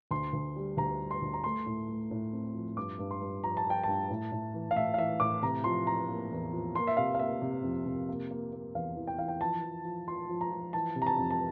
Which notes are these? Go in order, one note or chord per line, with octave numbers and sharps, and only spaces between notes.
D2 C6
D2
G3
D2 A#5
G3
C6
D2
A#5
A3 C6
A2
A3
A2
C4
F3
G2 D6
G2
C6
G2
F3 A#5
A5
F3
G5
G2 A5
A2
A2
E3
F5
A2 E5
F5
E3 E5
A2 D6
C3 A#5
F3 C6
F3 A#5
A#3
E2
F3
A#3 C6
E5
C3 F5
F5
A#3 E5
C3
F2
C3
A#3
A#3
A#3
E2 F5
E3
G5
E3 F5
G5
F3 A5
F3
F3
F3 C6
F3
A#5
F3
E3 A5
C3
A#5
A5
F2
A5